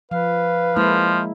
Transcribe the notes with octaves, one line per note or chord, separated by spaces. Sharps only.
F3 B4 F5
F3 G#3 A#3 E4